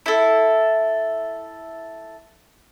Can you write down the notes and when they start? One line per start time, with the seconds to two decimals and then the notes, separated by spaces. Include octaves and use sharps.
0.06 E4 A4